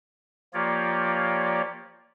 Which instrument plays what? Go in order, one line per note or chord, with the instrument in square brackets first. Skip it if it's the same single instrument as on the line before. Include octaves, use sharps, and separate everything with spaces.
[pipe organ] F3 A#3 F4 G4 C#5 D5